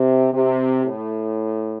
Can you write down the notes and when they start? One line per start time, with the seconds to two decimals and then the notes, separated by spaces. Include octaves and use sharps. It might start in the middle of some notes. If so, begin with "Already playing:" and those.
Already playing: C3
0.32 C3
0.85 A2